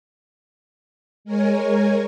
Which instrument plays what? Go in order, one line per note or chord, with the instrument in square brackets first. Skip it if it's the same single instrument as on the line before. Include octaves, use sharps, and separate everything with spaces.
[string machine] G#3 A#4 C#5 G#5